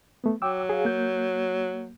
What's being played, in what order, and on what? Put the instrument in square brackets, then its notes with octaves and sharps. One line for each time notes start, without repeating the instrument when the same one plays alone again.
[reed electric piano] A3 B3
[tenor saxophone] F#3 [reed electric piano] G5 D6 E6
[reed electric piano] G#4 F5
A#3 G6